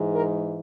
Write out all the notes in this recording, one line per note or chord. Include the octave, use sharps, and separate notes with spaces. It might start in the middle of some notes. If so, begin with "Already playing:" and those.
Already playing: G#2 E3 G#3
A#4